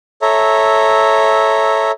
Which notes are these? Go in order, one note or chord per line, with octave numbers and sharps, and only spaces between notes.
A4 C#5 E5 A#5